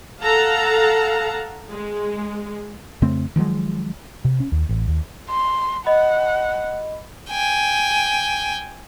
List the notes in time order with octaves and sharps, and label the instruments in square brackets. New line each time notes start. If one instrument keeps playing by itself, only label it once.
[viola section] A4 F5 F#5 A5 A#5
G#3
[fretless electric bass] F2 C#3 A3 C4
D#3 F3 F#3 G#3
[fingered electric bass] C3
C#4
D#2
A1
D#2
[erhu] C6
[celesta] D#5 B5 [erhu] F#5
[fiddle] G5 G#5